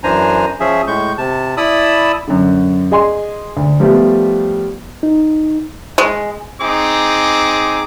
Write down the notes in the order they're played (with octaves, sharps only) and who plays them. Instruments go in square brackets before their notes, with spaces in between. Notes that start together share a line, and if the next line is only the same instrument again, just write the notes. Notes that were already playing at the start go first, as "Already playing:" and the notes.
[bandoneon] F#2 E3 D4 C5 G#5 A#5
F3 C#4 G#4 E5
A2 G#3 C#6 G6
C3 A5
E4 D5 A5 B5 D#6 E6
[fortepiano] F#2 D3
G#4 D#5 G#5 C6
D2
F3 G3 A3 B3
[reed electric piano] D#4
[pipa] G#3
[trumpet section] C4 D#4 G#4 D6